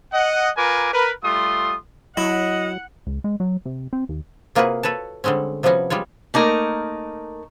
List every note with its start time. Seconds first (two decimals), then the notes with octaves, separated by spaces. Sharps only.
0.12 D#5 F#5
0.57 F4 A#4 B4 G#5 A#5 D6
0.92 A#4 B4
1.23 G3 A3 F4 C6 D#6
2.17 F#3 E4 D#5 F#5
3.07 C#2
3.24 G#3
3.40 F#3
3.66 C3
3.93 C4
4.09 D#2
4.55 C3 A#3 F4 F#4 G#4 B4
4.83 A4 B4 C#5 A5
5.24 D3 G3 G#3 C4 C#4
5.63 C3 F3 G3 B3 C#4 F#4
5.90 G3 G#3 F4 C#5
6.34 A3 A#3 D#4 A#4